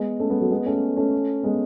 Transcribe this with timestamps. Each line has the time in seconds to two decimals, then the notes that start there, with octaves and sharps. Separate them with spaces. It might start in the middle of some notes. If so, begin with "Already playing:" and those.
Already playing: G#3 B3
0.20 A3 C#4
0.30 G#3 B3
0.40 F#3 A3
0.51 G#3 B3
0.66 A3 C#4
0.97 A3 C#4
1.43 G#3 B3